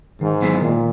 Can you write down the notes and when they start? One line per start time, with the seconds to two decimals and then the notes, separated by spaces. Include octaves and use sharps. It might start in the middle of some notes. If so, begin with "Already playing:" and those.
0.21 G#2 D#3
0.42 F#3 B3 E4 G#4
0.61 A#2 D#3